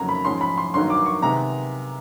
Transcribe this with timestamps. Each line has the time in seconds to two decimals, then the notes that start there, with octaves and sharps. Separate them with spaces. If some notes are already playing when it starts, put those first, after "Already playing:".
Already playing: F2 C#3 F#3 A#3 D#4 A#5
0.09 B5
0.25 G#2 F3 G#3 C#4 C6
0.41 B5
0.58 C6
0.74 G2 D#3 F#3 A#3 D#4 C6
0.90 D6
1.06 C#6
1.22 C3 D#3 G#3 B3 A#5